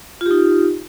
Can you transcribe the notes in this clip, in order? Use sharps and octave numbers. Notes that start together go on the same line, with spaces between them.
D#4 F4 G4